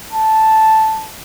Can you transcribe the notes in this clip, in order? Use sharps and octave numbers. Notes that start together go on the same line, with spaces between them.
A5